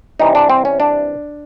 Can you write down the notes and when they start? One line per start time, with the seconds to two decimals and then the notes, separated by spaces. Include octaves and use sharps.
0.20 C3 E3 G3 D#4
0.35 D4
0.50 C4
0.65 C#4
0.80 D4